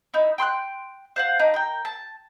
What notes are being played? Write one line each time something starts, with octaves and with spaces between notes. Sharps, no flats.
D#4 E4
G5 C6 E6 F#6
C5 F5 F#5
D4 D#4
A#4 G5
A5